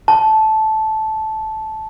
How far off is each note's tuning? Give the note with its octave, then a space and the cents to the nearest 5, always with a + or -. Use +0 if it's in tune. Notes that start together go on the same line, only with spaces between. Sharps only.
A5 -10